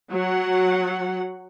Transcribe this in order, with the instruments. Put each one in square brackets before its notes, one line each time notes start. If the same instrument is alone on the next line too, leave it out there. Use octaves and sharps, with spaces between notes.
[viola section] F#3 F#5